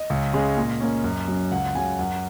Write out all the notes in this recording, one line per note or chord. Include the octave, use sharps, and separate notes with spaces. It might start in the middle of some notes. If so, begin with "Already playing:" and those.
Already playing: D#5
C#2
C#3 G#3 C#4
A#2
A#3 C#4
F#2
F#3 C#4
C#2 F#5
C#3 F#3 G#5
F#2 F#5